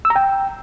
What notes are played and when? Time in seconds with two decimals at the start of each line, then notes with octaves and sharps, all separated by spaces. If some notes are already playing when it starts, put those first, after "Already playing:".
0.05 E6
0.10 A#5
0.16 G5